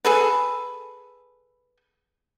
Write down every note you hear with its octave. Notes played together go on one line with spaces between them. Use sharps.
G#4 A4 B4